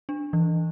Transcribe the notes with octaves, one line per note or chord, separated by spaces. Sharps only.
D4
E3